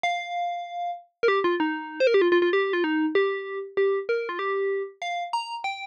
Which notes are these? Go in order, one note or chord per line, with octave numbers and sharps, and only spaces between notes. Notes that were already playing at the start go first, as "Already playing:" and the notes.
F5
A#4
G4
F4
D#4
C5
A#4
G4
F4
F4
F4
G4
F4
D#4
G4
G4
A#4
F4
G4
F5
A#5
G5